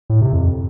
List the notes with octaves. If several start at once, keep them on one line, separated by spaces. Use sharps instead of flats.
A2
C3
F2